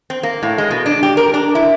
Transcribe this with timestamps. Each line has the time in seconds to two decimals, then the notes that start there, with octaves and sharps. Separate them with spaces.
0.10 C4
0.23 A#3
0.43 A2
0.58 G#3
0.71 B2
0.86 D4
1.03 G4
1.17 A#4
1.34 D4
1.55 E4